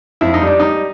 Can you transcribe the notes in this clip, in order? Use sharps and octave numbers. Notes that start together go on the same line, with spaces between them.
F2 E4
D#4
G3 D4
G3 D#4